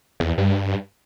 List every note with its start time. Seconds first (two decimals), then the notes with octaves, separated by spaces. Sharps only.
0.20 E2
0.38 G2